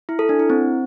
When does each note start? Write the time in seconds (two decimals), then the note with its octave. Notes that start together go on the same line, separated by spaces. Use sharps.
0.09 E4
0.19 A4
0.29 D4
0.39 E4
0.50 C4